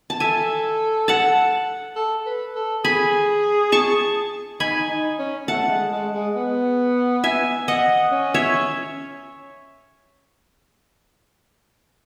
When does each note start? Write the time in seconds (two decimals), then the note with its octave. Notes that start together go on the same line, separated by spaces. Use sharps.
0.10 A5
0.20 A4 E5 G#5
1.08 F#5 A5
1.96 A4
2.26 B4
2.55 A4
2.84 G#4 G#5 B5
3.72 A5 C#6
4.60 D#4 G#5 B5
4.89 D#4
5.19 C#4
5.48 A3 F#5 A5
5.70 G#3
5.92 G#3
6.14 G#3
6.36 B3
7.24 E5 G#5
7.68 D#5 F#5
8.12 C#4
8.34 C#5 E5